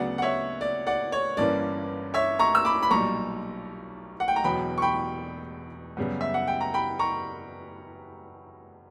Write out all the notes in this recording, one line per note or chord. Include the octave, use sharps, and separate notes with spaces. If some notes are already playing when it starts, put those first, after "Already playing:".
Already playing: D2 C#3 F#3 B3 D5 F#5
F#5
C#5 E5
D5
D5 F#5
C#5
G1 G2 E3 A#3 C#4 D5
C#5 E5
A#5 C#6
E6
B5 D6
B5
B1 A#2 G3 A#5 C#6
F#5
G5
A#5
E1 E2 B2 F#3 G5 B5
C#6
G5 B5
F#2 C#3 G3 B3
E5
F#5
G5
A#5
G5 B5
A#5 C#6